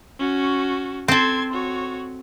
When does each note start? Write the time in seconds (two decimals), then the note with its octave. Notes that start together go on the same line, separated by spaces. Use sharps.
0.19 C#4 F#4
1.08 C4 A4 C6 G#6
1.53 F#4 C#5